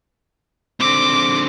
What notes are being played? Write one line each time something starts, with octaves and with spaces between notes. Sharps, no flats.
D3 C4 D6